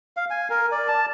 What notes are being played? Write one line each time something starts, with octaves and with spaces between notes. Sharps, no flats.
F5
G#5
A#4
D5
A5